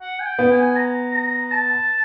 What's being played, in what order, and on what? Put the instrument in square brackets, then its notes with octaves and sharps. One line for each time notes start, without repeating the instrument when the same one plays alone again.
[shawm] F#5
G#5
G5
[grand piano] B3
[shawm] G#5
A#5
A#5
A5